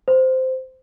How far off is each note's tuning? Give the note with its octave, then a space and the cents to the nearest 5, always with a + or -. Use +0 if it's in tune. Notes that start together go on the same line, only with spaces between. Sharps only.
C5 -10